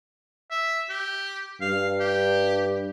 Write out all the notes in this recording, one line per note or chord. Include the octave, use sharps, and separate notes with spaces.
E5
G4
G2 F5
G4